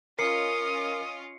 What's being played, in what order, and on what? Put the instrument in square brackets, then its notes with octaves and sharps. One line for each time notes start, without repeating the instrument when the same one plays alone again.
[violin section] C#4 F4 D#5 [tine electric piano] A#4 [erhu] D#6 [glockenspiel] C7 C#7